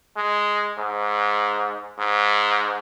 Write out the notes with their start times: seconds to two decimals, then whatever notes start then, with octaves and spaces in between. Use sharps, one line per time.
0.16 G#3
0.77 G#2
1.99 G#2